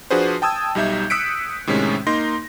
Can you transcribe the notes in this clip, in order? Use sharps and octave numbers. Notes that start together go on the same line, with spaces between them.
F3 D4 F#4 G#4 B4 C5
G5 A5 D#6 E6 G#6
B1 G3 D#4 E5 G6
D#6 E6 F#6 B6 C#7 D7
A2 C3 D#3 G#3 C#4
A#3 D#4 C6 A#6